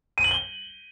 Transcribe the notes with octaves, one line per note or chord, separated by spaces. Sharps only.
D#7
F#7
G7